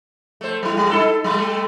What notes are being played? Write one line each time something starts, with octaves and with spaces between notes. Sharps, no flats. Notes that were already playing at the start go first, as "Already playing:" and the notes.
A3 C5
G3 E4
G3
D#4 E4 A4
G3 A3